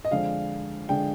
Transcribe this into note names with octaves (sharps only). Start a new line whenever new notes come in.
D#5
F2 D3 G#3 D4 F5
D3 G#3 D4 G5